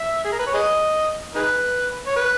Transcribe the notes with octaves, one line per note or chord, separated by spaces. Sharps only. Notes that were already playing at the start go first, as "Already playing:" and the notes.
Already playing: E5
G#4
A#4
B4
C#5
G#4 B4 D#5
D#4 G#4 B4
C#5
B4